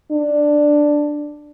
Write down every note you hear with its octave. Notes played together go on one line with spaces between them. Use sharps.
D4